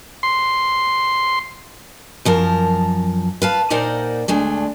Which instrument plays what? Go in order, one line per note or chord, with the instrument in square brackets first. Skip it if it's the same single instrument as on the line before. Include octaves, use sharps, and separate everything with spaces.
[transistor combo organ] C6
[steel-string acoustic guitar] F#2 F3 A#4 A5
B4 F5 A5
A#2 D#4 A#4 C5 D5 F#5
D2 G#3 A3 D4